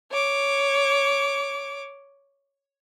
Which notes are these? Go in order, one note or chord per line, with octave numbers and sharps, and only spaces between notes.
C#5 D6